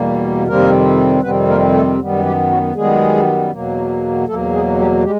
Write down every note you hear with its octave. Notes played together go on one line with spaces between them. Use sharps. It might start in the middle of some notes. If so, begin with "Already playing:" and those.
Already playing: E2 B2 G3 A#3
F2 C3 D#3 G3 A#3 C4 A#4
F2 C3 D#3 G3 B3 C4 B4
A#3 A#4
A3 A4
F#2 D#3 G3 B3
G3 G4
F#3 F#4
F#2 D#3 G3 G#3 B3 G#4
E2 B2 F#3 A#3
E2 B2 F#3 A3 A#3 A4
G#3 G#4
G3 G4
G3 G#3 G4